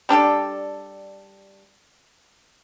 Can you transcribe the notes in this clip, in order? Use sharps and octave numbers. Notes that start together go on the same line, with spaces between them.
G3 D4 G4 A4